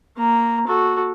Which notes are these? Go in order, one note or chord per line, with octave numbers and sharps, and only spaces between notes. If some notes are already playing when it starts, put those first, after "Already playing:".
A#3 A#5
F#4 A4